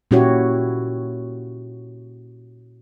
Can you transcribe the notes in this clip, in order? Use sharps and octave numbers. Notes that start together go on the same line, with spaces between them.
A#2 C#4 E4 F#4 G4 C#5